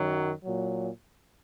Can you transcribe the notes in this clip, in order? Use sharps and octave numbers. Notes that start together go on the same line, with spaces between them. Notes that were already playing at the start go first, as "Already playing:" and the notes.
Already playing: F#2 D#3 F#3
A#2 F#3